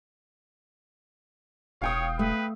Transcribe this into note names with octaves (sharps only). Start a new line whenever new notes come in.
E1 C#5 F5 G5 D#6
A3 B4